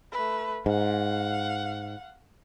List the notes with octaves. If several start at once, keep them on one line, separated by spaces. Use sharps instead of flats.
A3 B4
G#2 F5 F#5